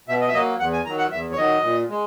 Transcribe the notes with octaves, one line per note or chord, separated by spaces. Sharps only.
B2 E5
D#5
E5
F#3 A#3 D#5
E2 F#5
G#5
D#3 F#3 A#5
F#5
E2 E5
C#5
D#3 F#3 D#5
A#2
G#3